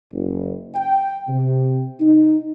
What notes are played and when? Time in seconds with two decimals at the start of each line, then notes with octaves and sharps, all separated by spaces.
0.12 F#1
0.74 G5
1.28 C3
2.00 D#4